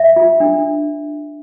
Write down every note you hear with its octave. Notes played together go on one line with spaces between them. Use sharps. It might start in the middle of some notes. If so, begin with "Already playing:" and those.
Already playing: E5
F4
D4